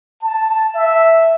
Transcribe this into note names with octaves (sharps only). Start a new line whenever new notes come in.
A5
E5